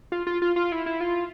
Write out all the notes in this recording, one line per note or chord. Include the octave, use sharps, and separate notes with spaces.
F4
F4
F4
F4
E4
E4
F4